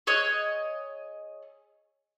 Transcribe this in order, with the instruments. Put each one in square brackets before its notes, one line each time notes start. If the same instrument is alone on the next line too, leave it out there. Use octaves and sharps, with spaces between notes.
[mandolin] G#4 C#5 D#5 F#6